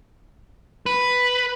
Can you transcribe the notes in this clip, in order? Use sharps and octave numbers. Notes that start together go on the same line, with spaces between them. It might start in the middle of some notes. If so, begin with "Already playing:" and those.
B4